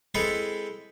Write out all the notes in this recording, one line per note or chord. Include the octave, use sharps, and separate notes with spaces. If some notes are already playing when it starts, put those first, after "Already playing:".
G#3 C4 E4 G#4 A4 B4